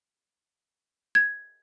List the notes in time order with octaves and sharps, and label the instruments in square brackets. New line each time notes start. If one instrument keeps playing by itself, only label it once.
[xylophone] G#6